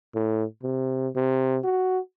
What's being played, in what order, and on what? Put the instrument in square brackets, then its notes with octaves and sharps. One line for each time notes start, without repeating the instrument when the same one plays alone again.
[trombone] A2
C3
C3
F#4